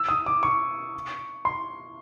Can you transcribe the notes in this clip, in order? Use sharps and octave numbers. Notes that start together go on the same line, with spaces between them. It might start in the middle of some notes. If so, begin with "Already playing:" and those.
Already playing: E6
D#6
D6
C#6
C6